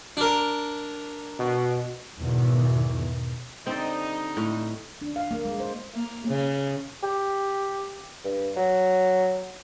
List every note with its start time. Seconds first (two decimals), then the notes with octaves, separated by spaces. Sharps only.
0.17 D4 A#4
1.39 B2
2.20 E2 G#2 B2 D#3 E3
3.67 D3 G3 C4 D#4 D5
4.37 A2
5.01 D4
5.16 F5
5.31 A#3
5.45 G#3
5.60 C5
5.94 A#3
6.28 C#3
7.03 G4
8.25 G2
8.56 F#3